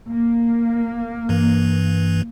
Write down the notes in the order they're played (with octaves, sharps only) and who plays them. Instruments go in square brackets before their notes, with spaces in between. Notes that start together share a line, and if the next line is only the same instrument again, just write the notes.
[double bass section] A#3
[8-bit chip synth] G2 E3